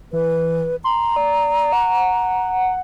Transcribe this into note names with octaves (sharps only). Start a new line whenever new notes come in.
E3 B4
A#5 C6
D5
F#5